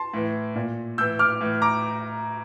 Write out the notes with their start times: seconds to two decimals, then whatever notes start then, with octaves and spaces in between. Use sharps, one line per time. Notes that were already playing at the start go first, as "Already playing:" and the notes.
Already playing: A5 C6
0.13 A2 E3
0.55 A#2
0.98 A2 E6 G6
1.01 E3
1.19 D6 F6
1.41 A2 E3
1.62 A#5 D6